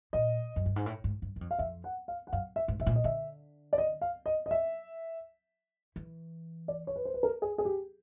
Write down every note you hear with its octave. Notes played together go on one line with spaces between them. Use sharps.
A#2 D#5
F#2
G2
G#2
A2
G#2
G2
F#2
F2
F5
F2 E5
F#5
F5
F#5
F#2 F5
E5
G#2
B2 E5
A#2
D#5
D3 E5
D5
D#5
F5
D#5
D#5
E5
E3
D5
C#5
B4
C5
B4
A#4
G#4
G#4
G4